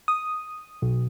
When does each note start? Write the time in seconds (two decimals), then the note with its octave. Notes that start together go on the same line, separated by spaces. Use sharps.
0.08 D#6
0.82 B1